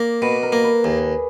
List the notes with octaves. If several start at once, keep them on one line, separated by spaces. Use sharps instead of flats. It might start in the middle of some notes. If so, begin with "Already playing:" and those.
Already playing: A#3 D5
B2 B4
A#4
A#3
B4
D#2 G#4